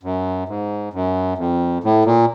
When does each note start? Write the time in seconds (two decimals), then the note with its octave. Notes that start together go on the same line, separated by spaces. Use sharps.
0.03 F#2
0.49 G#2
0.93 F#2
1.38 F2
1.84 A2
2.05 A#2